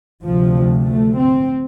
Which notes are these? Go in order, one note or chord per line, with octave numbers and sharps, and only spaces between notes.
D2 C3 F3
A3
C4